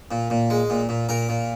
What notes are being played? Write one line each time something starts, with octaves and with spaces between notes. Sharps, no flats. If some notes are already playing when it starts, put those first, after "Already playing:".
A#2
A#2
G#3
A#2
A#2
A#2 A#4
A#2